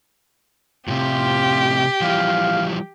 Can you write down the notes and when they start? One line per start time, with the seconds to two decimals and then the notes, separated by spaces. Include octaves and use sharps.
0.88 A2 C3 C4 F4 G4
2.01 E3 F3 G3 F5